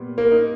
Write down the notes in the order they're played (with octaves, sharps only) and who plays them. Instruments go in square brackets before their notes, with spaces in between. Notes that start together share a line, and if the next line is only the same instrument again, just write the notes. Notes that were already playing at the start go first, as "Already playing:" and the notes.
Already playing: [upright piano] A#2 G3 B3
[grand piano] A#3
[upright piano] D#4